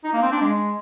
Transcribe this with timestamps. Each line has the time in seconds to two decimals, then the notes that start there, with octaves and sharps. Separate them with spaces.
0.04 D#4
0.13 A#3
0.23 C4
0.32 D4
0.41 G#3